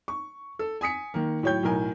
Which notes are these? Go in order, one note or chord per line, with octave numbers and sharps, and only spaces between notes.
C#6
A4
G#5 D#6 B6 C#7
D#3 A#3
A2 F#3 C#5 G5 G6
B1 A2 A#4 G#5